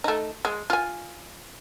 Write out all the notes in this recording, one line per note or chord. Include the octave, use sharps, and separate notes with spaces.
A3 D#4
G#3
F4 G#5